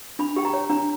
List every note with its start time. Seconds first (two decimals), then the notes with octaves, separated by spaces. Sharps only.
0.19 D4 B5
0.36 G4 G5
0.45 A#5
0.53 C#5
0.70 D4 A#5